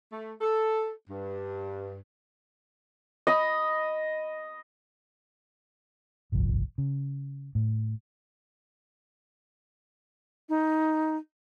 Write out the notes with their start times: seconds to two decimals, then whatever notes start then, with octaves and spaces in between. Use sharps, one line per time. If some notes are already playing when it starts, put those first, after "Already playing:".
0.12 A3
0.41 A4
1.10 G2
3.27 D#5 B5
6.32 D1 G1 C2 F3
6.78 C#3
7.55 A2
10.49 D#4